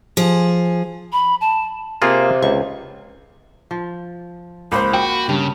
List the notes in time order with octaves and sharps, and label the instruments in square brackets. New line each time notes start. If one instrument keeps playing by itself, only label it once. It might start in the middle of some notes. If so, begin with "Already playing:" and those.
[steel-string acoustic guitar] F3 G#4
[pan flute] B5
A5
[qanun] C3 [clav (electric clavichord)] A#3 F4 G#4
[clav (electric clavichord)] C#2 [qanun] C#6
[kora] F3
[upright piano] C#2 C5 [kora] A#3 [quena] B5
[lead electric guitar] F#4 [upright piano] G5
[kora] G2 [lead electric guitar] C#3